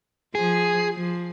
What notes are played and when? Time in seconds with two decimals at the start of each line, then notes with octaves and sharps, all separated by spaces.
0.35 F3 G#4
0.94 F3